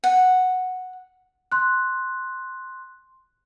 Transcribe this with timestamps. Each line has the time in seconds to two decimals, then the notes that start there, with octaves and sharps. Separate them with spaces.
0.04 F#5
1.52 C6 F#6